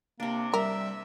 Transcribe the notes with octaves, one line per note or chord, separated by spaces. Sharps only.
C3 A#3 D4
G3 A#4 E5